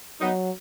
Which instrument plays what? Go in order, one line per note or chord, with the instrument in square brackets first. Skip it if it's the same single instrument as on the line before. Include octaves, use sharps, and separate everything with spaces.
[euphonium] F#3 [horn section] B3 D#4